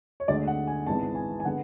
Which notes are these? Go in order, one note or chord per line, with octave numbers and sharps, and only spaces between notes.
C#5
D2 D3 G#3 D5
F#5
G#5
G#1 G#2 E3 G#3 B3 A5
G#5
G#5
D3 G#3 B3 F#5